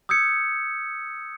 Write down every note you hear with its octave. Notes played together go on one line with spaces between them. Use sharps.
D#6 E6 G6 G#6 C#7